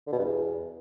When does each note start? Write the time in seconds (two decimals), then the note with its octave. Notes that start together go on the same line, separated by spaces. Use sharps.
0.07 D3
0.13 B2
0.19 G2
0.25 E2